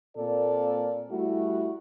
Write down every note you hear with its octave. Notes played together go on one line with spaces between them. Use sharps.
A#2 A#3 C4 A4 D5
G3 A3 E4 F#4